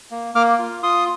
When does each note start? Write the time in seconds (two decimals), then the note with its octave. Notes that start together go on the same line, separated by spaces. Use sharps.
0.11 A#3
0.35 A#3 D6 F6
0.59 F4
0.83 F4 C6 D#6